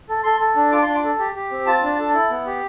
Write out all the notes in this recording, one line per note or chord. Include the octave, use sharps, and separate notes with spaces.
A4
A4 C6
A4
D4
F4 D6
D4 C6
D6
A4
G4
G4
C4
F4 A5
D4
A4
E4
B3
G4